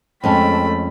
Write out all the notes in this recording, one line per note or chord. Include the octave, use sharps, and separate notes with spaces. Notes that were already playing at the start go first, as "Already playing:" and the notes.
F2 G#3 A3 C#4 G#4 G5 A5 B5